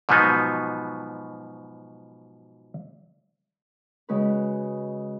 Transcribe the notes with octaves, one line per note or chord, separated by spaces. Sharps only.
G#2 B2 F3 F#3 B3 D#4
C#3 G#3 C#4 F#4 B4